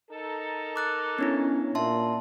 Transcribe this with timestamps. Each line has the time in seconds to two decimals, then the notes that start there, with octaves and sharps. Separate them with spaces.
0.11 D#4 A4 A#4
0.76 D6 F#6 A6
1.19 B3 C#4 D4 E4
1.75 A#2 E5 A5 C6